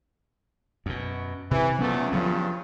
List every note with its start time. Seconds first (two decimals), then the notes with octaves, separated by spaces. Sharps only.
0.86 F#2 B2
1.51 C3 E3
1.80 E2 A#2 F#3 A3 B3 C#4
2.12 G2 C#3 F3 F#3 B3 F4